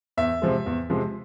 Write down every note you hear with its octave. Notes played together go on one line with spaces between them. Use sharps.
E2 E5
C3 F3 G#3
E2
C3 F3 G#3